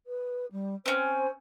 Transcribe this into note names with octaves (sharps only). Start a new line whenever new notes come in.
B4
G3
C4 C#4 C5